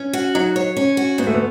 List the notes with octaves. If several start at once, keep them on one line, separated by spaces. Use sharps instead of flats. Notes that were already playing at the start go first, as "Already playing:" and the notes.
Already playing: C#4
F#4
F#3 D#4
C#5
C#4
F#4
G#2 B3
A3
B3